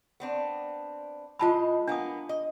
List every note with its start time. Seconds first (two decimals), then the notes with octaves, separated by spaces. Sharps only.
0.20 B3 C4 D4
1.39 A2 G#3 F4 D#5 A5 B5
1.87 A#3 B3 D4 D#6
2.29 D#5